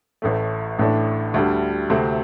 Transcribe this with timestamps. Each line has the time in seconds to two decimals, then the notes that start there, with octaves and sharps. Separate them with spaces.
0.22 A1 A2 A3
0.79 A1 A2 A3 D4
1.34 D2 D3 G3
1.90 D2 C3 A3 C4